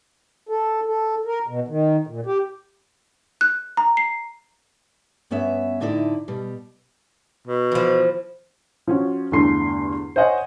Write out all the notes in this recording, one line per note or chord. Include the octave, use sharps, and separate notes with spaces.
A4
A4
A#4
B2
D#3
A#2
G4
F#6
A#5
C7
G2 B3 C#4 C#5 E5
A2 D3 D#4 E4 C#5 D5
B2 G3
B2
E3 F3
F3 C#4 F#4
E2 G2 D3 A3 C6 C7
C5 C#5 D#5 F#5 G#5